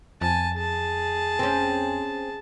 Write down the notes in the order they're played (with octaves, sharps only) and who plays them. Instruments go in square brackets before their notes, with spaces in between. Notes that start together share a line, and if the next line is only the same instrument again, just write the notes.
[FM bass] F2 [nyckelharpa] G#5 A5
[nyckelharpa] G#4 A5
[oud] C4 C#4